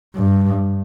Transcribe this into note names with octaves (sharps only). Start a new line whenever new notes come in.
G2